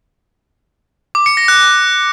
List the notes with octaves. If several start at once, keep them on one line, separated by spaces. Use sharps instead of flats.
D6
C#7
A#6
F#6